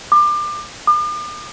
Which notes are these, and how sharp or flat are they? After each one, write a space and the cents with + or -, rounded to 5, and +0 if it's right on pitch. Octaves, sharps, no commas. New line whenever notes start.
D6 +30
D6 +45